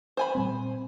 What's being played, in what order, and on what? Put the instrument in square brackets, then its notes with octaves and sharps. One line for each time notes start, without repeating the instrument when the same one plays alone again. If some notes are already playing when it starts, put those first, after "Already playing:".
[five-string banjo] C5 G#5 B5
[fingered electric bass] A#2 G3 C4